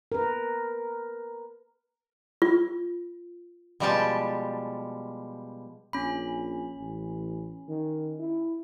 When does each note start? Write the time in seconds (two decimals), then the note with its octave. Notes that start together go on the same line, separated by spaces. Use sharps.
0.12 A#4 B4
2.42 F4
3.80 B2 F3 G3 G#3 G4 A5
5.93 A#1 C#4 B5
6.78 A1
7.69 D#3
8.19 E4